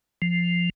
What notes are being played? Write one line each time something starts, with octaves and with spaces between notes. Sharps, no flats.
F3